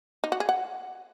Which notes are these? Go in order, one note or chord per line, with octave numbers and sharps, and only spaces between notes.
D#4
F#4
G#4
F#5